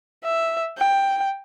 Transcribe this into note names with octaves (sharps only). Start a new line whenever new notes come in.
E5
G5